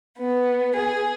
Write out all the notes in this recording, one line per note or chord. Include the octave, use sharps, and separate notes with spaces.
B3
G#4